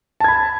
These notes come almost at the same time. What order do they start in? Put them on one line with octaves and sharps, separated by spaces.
A5 G#6 B5